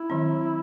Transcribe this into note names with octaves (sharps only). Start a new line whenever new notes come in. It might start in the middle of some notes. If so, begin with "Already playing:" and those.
Already playing: E4
D#3 F#3 C4